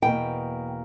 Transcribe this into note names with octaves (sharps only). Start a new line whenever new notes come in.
E2 B2 A#3 G5